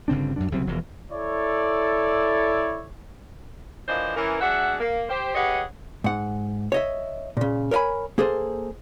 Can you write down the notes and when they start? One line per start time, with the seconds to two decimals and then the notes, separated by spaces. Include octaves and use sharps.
0.08 G1 C#3 C4 D4
0.36 F#2 F#3 D4
0.52 C2 C#3 F#3 C4
0.67 E1 E2 F3
1.11 E4 A4 C#5 D5
3.88 E3 F3 A#3 D4 C5 D#5
4.16 E3 C#4 A#4
4.41 G#3 D4 F#4 E5 F#5
4.80 A#3
5.09 G4 C5
5.35 G4 G#4 B4 C#5 D#5 F#5
6.04 G#2 F#5
6.72 C#5 D#5 E5
7.37 A#2 C#3
7.71 A#4 C#5 D#5 G#5 B5
8.18 A#3 G#4 A4 C5